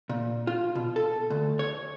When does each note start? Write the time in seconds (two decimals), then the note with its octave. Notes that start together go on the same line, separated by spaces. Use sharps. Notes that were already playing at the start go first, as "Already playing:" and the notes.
0.09 A#2
0.47 F4
0.75 B2
0.96 A4
1.30 D2
1.59 C#5